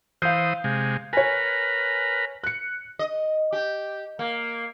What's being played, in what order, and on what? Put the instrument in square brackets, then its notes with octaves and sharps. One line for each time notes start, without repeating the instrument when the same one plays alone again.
[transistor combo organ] E3 C5 D#6 [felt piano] F5 G6
[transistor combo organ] C3 G#3
[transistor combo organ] A#4 B4 [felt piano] C#5 G#5
[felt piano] F#6 C#7
[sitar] D#5
G4
A#3